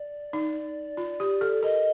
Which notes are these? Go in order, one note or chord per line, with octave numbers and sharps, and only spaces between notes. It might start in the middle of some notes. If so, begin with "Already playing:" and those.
Already playing: D5
D#4
F4
G4
A4
A#4 D#5